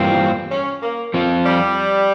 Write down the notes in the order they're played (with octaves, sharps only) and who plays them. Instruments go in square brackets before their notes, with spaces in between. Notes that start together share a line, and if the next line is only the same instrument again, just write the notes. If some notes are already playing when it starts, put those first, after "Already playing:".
Already playing: [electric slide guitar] G2 E3 G3 A#3 F4 [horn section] C4
[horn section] C#4
A#3
[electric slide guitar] F3 C4 F4
[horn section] G3